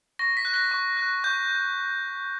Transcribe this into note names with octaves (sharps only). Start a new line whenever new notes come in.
C#6 A#6
B6
F#6
A#6
C#6
F#6
C#6 G6